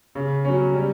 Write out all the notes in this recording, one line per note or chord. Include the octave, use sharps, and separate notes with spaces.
C#3
F#3 C#4
G3